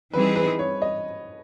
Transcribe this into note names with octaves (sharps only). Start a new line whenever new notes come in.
E3 G3 C4 D#4 G#4 B4
B4
C#5
D#5